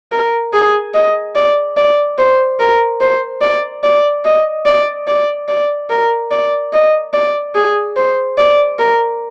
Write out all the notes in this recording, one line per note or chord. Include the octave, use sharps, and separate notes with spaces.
A#4
G#4
D#5
D5
D5
C5
A#4
C5
D5
D5
D#5
D5
D5
D5
A#4
D5
D#5
D5
G#4
C5
D5
A#4